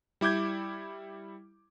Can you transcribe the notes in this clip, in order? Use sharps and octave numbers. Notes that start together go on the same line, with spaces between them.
G3 E4 D6 G6 G#6